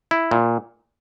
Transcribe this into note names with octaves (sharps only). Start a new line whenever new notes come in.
E4
A#2